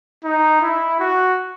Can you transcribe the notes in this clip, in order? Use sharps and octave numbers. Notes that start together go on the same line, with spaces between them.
D#4
E4
F#4